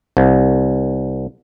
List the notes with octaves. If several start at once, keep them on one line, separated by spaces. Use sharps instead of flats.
C2